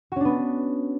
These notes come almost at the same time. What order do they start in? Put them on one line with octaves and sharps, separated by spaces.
F#4 C#4 D4 B3